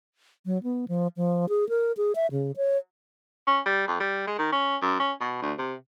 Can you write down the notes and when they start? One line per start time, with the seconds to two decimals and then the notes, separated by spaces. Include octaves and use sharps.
0.46 F#3
0.63 B3
0.88 F3
1.17 F3
1.49 G#4
1.69 A#4
1.97 G#4
2.15 E5
2.31 C#3
2.56 C#5
3.48 C#4
3.66 G3
3.88 F2
4.00 G3
4.27 G#3
4.38 D#3
4.52 C#4
4.82 F#2
5.00 C#4
5.21 B2
5.42 D2
5.58 C3